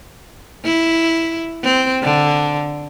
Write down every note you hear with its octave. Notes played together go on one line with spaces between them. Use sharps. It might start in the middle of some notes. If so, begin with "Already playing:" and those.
E4
C4
D3